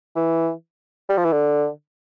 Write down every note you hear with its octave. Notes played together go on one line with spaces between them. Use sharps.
E3
G3
F3
E3
D3